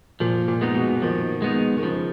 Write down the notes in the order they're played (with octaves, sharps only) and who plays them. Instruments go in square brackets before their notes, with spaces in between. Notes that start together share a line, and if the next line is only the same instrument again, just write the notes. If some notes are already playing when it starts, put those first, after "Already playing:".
[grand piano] A#2 [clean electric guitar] F3
[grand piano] A#2
[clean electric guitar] G#3 B3 D#4
[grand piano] B2
[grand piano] D#3 [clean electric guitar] F3
[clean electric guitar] G#3 B3 D#4
[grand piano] D#3
[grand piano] C#3 [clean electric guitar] F3